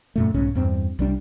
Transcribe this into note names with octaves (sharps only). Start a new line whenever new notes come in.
F#2 A#2 A3
B1 G#2 C#3 C#4
E2 G2 C4
C2 G3 D4